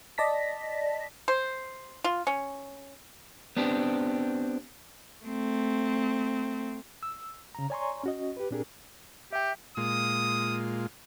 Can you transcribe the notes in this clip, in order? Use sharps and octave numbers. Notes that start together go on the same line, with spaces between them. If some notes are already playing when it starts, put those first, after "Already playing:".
D5 D#5 A5 A#6 B6
C5
F4
C#4
B3 C4 D4 G4
A3 C4
E6
C#3 A#5
C#5 D5 G#5 A#5 C6 C#6
C#4 F#4 D#5
G4 B4
A#2 C4 D4 G4 G#4 A#4
G4 E5 G5
A#2 G#3 F4 D#6